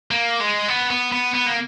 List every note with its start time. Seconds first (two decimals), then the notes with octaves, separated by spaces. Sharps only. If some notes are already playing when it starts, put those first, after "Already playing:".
0.11 A#3
0.40 G#3
0.68 B3
0.90 B3
1.12 B3
1.34 B3
1.46 A#3